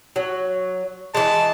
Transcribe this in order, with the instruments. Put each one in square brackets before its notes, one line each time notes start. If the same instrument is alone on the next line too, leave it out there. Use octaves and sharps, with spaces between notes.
[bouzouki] F#3
[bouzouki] E3 G#3 [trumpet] A5